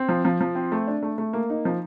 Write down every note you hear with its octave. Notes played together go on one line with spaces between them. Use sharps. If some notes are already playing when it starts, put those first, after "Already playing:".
Already playing: C4
F3
F3
F3
C4
A3
D4
A3
A3
A#3
D#4
F3